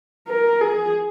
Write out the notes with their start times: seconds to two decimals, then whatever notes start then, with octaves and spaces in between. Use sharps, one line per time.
0.27 A#4
0.61 G#4